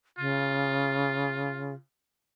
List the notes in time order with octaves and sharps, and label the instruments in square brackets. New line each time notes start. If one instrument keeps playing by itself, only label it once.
[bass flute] C#3 [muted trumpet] F4